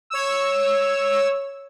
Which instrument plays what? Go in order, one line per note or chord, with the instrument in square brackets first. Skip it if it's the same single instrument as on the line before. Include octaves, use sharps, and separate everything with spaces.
[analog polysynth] C#5 E6